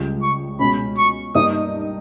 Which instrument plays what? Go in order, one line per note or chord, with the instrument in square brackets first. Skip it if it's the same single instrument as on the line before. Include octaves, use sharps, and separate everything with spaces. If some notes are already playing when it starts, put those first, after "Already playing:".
Already playing: [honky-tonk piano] C#2 C#3 G3
[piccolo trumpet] C#6
[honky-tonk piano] B2 G#3 C#4 [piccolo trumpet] B5
[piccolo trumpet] C#6
[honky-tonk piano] G2 G3 A#3 D#4 [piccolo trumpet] D#6